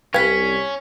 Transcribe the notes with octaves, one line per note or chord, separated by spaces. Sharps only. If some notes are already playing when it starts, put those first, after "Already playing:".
C2 C#4 B4 F5 G5 G#6 B6